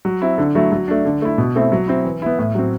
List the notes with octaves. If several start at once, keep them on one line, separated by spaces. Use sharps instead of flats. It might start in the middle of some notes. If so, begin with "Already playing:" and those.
F#3
C4 E4
D3
F#3 A3 E4
F#3
A3 D4
D3
A3 E4
B2
A3 C4 E4
F#3
C4 E4
E3
B3 E4
A2
F#3 C4